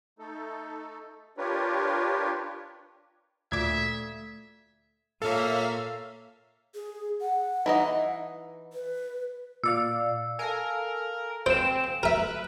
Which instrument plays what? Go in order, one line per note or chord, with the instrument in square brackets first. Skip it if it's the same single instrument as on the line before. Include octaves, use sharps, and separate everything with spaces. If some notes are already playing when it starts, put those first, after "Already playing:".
[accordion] A3 D#4 A4
D4 F4 G4 A#4 B4 C#5
[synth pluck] D2 A#2 D6 [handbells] A3 [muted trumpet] E5 [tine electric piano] G#6
[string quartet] A#2 A#3 C#5 [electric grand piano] A4 [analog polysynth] E5 F5
[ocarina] G#4
F#5
[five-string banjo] E3 D#4 D#5
[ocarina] B4
[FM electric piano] A#2 D5 F5 [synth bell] E6
[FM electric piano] A4 F5 G#5 [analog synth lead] A#4
[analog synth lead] C4 [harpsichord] C5 [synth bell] D7 E7
[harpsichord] A#4 E5 [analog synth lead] B4